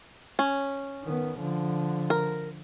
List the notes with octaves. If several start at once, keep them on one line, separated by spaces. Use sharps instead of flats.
C#4
D#3 B3
D3 F3
A#4